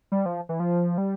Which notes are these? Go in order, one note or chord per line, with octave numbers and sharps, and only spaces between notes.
G3
F3
E3
F3
G3